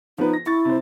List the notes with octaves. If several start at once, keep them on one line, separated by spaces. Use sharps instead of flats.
F3 B3 D#4 B4
A#6
E4 C#6 A6
C3 C5